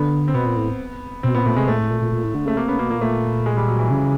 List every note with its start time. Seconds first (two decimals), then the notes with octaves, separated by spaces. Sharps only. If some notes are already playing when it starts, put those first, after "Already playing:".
Already playing: D3 B3
0.28 C4
0.34 B2 B3
0.46 A#2
0.57 A2
1.23 B2 C4
1.34 A#2 B3
1.45 A#2 A3
1.57 C3 G#3
1.68 A#2 A3
1.79 A2
1.90 A#2
2.01 A#2
2.12 A#2
2.24 A2
2.35 D3
2.45 C#3 A3
2.57 C3 A#3
2.68 C#3 B3
2.79 B2 A#3
2.90 A#2 A#3
3.01 A#2 A3
3.46 G#3
3.57 G3
3.68 F#3
3.79 E3
3.91 C#3